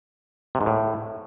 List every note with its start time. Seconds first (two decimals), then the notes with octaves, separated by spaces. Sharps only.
0.55 C3
0.61 G#2
0.66 A2